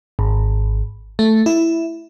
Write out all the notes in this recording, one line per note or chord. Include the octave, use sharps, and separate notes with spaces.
G#1
A3
E4